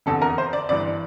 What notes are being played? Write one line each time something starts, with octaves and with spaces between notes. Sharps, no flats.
F1 E2 D3 A4
A#4
C5
D5
G1 G2 E3 D5